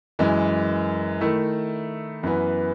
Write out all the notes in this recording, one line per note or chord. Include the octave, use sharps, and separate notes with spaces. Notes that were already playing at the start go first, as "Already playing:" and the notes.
F#2 E3 G#3
D#3 A3 E4
F#2 E3 B3